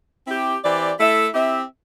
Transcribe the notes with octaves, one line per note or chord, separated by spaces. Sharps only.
C4 E4 G4
E3 C4 G4 D5
A3 E4 A4 E5
C4 E4 G4 E5